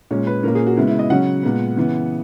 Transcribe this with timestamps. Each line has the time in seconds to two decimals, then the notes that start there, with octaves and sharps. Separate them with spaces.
0.11 A#2 G#3 C#4 C#5
0.27 B4
0.43 A#2 A#3 C#4 A#4
0.55 G#4
0.67 F#4
0.77 C#3 G#3 B3 E4
0.87 E4
0.99 D#5
1.10 C#3 F#3 C#4 F#5
1.43 A#2 G#3 B3
1.77 C#3 E3 B3